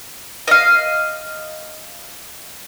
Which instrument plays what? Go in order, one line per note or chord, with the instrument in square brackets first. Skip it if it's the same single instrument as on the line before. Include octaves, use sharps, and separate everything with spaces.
[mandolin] D#5 F5